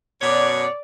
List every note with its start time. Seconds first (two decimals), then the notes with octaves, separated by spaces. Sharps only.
0.21 F#2 B2 C#5 D5